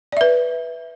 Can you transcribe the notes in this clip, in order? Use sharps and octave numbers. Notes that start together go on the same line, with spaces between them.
B4 D5 E5